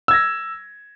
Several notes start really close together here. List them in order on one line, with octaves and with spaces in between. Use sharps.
E6 G#6 A#6